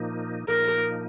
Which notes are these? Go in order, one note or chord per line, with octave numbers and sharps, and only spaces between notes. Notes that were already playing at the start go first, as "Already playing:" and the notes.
Already playing: A#2 F3 A#3 D#4
A#2 F3 A#3 D#4 A#4